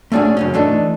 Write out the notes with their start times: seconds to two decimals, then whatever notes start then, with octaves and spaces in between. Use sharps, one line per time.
0.12 A3 C#4 D4 F#4 G#4
0.37 F#2 C#3 C#4
0.54 E3 A3 D4 D#4